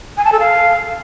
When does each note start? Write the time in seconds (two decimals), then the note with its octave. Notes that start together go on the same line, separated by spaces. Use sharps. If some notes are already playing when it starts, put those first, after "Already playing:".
0.17 G#5
0.25 A5
0.32 A4
0.40 F5